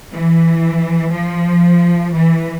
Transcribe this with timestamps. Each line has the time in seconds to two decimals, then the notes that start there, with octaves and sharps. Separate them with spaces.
0.12 E3
1.12 F3
2.11 E3